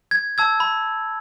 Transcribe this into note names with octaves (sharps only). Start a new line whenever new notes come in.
G#6
A5 E6 G#6
B5